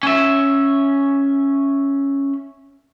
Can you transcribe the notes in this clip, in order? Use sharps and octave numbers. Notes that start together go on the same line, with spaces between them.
C#4 E5